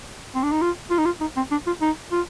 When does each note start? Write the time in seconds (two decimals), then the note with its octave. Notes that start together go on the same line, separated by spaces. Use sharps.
0.35 C4
0.43 D4
0.52 D#4
0.61 F4
0.90 F4
0.98 D#4
1.05 F4
1.21 D#4
1.36 C4
1.51 D4
1.67 F4
1.81 D#4
2.12 F4